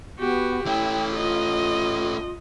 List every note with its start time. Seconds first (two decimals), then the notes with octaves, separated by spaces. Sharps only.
0.19 B3 F#4 G4
0.66 A3 C#4 E4 G5
1.16 F4 D#5